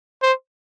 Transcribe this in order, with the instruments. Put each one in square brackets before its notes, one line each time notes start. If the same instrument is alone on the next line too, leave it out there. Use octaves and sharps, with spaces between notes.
[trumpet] C5